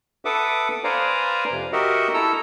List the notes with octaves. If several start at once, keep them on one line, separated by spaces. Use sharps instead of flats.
A4 B4 E5 F#5 D6 D#6
B4 C5 D5 F5 G#5 A#5
F2 C3
F#4 G4 A#4 D#5 E5 F#5
E4 A4 A#5 E6